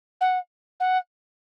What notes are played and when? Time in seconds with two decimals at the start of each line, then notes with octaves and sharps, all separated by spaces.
0.21 F#5
0.80 F#5